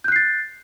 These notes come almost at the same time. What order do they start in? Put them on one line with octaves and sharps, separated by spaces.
G6 F#6 C7 A6